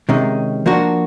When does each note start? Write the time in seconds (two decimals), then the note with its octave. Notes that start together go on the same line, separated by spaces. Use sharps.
0.09 C3 D#3 G#3 C#4
0.66 F3 A#3 D4 F#4